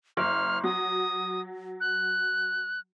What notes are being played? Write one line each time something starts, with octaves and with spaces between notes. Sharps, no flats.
F#1 F6
F#3 D#6
F#6